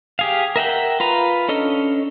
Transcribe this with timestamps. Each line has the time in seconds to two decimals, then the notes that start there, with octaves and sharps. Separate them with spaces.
0.19 G4 G#4 F5
0.56 A#4 E5 F#5 G5
1.00 F4 B4 A#5
1.49 C#4 D4 A4 D#5 F6